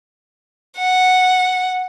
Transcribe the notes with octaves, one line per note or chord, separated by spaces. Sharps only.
F#5